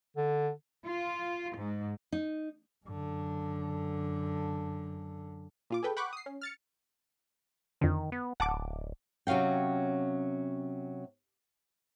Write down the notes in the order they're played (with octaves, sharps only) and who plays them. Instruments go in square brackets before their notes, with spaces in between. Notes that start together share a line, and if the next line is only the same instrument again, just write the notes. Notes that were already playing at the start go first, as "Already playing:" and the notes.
[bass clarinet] D3
[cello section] F4
G#2
[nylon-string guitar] D#4
[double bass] F#2 D3
[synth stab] A#2 F4 D6
G#4 A4 B4 G5
F#5 G5 B5 C#6 D6 F#6
D#6 C7
C#4
F6 A6 C#7
[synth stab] F2 D3 [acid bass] D#3
[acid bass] B3
[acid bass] D1 [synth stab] F#5 A5 D6
[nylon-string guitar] C3 F#3 C#4 F5 G5